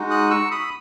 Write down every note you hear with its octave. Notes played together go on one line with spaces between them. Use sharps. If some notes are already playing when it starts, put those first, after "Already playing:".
Already playing: G#3 D#4 F#4
D#6 F#6
C#6 E6
B5 D#6